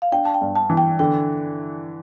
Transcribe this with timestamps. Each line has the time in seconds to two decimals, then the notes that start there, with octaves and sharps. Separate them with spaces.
0.02 F5
0.12 D4 G5
0.25 A5
0.34 G5
0.42 G2
0.55 A5
0.70 E3
0.77 G5
0.99 D3 G5